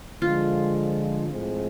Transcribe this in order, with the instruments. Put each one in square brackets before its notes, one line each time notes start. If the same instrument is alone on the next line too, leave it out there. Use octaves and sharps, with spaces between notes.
[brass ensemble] D3 F3 G#3 [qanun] F4
[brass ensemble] A2 F3 G#3 C4